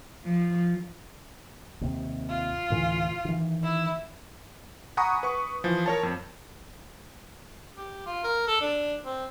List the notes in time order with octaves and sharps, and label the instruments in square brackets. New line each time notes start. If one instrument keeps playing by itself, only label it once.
[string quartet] F3
[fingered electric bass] D#2 C3
[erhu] F4
[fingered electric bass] D2 A2 E3
D#3 E3
[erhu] E4
[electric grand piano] F#5 G#5 A#5 B5 C#6 D#6
B4 C#6
E3 F3
A#4 C#5 A5
F2
[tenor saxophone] G4
F4
A#4
A4
D4
C4